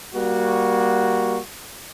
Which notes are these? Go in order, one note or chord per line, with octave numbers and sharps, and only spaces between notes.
G3 A#3 F#4